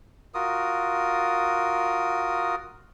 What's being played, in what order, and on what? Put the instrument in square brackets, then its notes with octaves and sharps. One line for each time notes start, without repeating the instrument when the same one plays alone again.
[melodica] F4 F#4 A#4 D#6